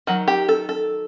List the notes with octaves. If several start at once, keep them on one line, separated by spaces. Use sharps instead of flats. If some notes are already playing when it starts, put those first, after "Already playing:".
D#3 F#3
G4
A4
A4